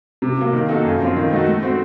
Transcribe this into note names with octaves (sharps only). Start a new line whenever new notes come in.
C3
F#3 A#3
D#3
A#3 D#4 F#4 A4
F#2
F3 C4 F4
D#3
A3 D#4 F#4
A3
C4 F#4